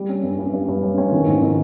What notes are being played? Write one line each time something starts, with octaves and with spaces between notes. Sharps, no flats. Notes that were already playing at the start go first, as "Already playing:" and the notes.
Already playing: G3
C#4
G2
G2
G2
G2
C#4
C#4
D#3
G#2
D#3